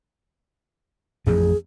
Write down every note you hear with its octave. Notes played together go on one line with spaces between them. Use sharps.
A1 F2 F3 G#4